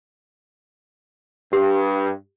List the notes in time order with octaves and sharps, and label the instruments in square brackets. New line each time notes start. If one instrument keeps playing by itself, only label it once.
[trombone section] G2 [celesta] G4